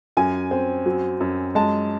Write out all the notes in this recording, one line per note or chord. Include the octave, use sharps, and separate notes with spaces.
F#2 G#5
C4
F#3
F#2
G#3 A5